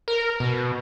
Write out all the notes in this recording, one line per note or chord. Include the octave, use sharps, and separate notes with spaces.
A#4
B2